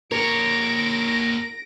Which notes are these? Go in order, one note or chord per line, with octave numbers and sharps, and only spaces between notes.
A#3 A#4 C#5 A#6 D7